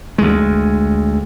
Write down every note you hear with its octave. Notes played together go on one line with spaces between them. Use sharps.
D2 G#3